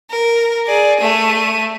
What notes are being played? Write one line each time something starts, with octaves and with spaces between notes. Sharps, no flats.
A#4
G#4 D5
A3 D#7